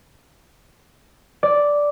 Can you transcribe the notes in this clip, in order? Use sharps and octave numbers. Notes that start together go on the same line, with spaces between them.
D5